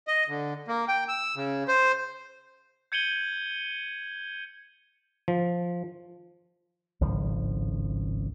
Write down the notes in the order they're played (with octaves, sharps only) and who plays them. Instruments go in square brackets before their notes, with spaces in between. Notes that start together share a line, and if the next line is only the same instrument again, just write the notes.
[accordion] D#5
D3
A#3
G5
E6
C#3
C5
[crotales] G6 G#6 C#7 D#7 F#7 G7
[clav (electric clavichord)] F3
[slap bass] G#1 C#2 A2 F3